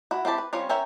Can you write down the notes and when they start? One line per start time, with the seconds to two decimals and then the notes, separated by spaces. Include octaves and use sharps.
0.11 E4 F#4
0.25 C4 E4 G4 A5
0.38 B4
0.53 G3 C4 C#4 F4 C#5
0.69 C#4 A#4 C#5 E5 G5